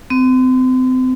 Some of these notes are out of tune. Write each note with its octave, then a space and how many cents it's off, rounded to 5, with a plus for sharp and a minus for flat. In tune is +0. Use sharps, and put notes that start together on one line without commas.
C4 -35